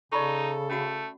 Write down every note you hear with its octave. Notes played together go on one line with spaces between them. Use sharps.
C#3 D#4 A4 D5 B5 C#6
A3 C#4 F#4 F#5